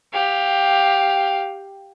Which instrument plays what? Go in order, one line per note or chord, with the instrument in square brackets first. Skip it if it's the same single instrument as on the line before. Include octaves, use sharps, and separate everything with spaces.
[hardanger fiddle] G4 F5